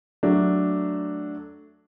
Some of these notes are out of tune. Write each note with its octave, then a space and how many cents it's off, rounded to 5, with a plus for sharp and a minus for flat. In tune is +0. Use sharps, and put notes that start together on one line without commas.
F#3 +5 A3 +0 D4 +0